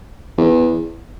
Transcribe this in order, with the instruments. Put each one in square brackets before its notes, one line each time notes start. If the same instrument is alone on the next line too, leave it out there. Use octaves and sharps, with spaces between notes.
[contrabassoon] E2